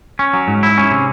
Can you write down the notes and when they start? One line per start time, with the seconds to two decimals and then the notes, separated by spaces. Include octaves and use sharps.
0.19 C#4
0.33 F#3
0.48 G#2
0.63 E4
0.78 C#4
0.91 C3